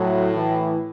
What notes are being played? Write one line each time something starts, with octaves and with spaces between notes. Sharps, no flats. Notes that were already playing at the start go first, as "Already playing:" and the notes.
Already playing: A2 F#3
E3